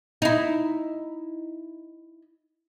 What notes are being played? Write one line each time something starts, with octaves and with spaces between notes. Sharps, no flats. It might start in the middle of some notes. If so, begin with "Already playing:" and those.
D#4 E4